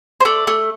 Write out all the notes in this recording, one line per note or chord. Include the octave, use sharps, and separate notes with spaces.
C5
A3 D5
A3